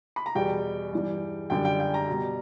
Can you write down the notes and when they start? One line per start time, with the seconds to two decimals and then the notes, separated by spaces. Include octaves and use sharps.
0.16 B5
0.26 A#5
0.35 E2 B2 G3 G5
0.93 G2 E3 G3
1.50 F#2 D3 G3 G5
1.65 G5
1.80 G5
1.94 A#5
2.08 B2 G3